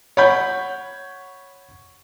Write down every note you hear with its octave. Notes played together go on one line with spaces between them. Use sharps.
C#5 F#5 B5 G6